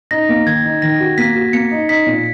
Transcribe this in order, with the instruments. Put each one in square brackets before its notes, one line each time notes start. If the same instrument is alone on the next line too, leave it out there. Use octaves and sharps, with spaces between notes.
[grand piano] D#4 [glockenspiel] A#6
[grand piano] A#3
[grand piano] D#3 [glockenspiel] G#6
[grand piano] D#4
[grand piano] D#3 [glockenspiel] A#6
[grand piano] F#4
[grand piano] A#3 [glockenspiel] B6
[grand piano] F#4
[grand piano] A#3 [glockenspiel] C#7
[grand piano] D#4
[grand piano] D#4 [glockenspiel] B6
[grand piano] A#2